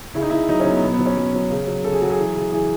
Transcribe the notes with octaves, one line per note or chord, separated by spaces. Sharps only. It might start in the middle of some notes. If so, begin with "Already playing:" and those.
C#3 E4
D#4
C#3 E4
F#3 D#4
C#4
F#3
B3
B2 B3
B3
F#3
C#4
F#3
F#3
C#3
F#3
C#3 A4
G#4
F#3 F#4
G#4
E3
C#3
E3 G#4